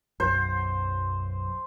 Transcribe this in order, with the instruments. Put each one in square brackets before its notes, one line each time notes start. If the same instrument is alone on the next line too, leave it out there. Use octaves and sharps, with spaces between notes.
[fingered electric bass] B1 F#2 [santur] C5